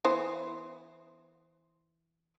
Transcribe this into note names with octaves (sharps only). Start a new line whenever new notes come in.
E3 B3 C5